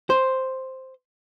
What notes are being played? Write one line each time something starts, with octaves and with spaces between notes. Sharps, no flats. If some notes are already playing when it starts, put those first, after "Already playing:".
C5